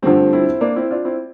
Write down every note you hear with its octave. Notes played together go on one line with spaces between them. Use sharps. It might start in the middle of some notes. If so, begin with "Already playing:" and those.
G2 D3 F3 A3 C4
C4 E4
A#3 D4
C4 E4
D4 F4
C4 E4